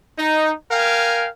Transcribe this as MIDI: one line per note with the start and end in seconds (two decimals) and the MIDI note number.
0.18 0.52 63
0.72 1.28 70
0.72 1.28 77
0.72 1.28 79
0.72 1.28 80